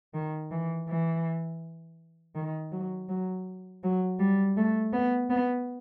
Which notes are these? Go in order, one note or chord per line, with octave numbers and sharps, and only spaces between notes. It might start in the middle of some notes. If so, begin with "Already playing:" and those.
D#3
E3
E3
D#3
F#3
F#3
F#3
G3
A3
B3
B3